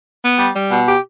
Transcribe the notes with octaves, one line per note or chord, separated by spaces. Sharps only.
B3
G3
G3
B2
G4